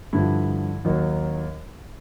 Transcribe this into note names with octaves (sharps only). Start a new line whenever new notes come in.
G2 D3 F3 E4
D#2 D#3 F#3 D#4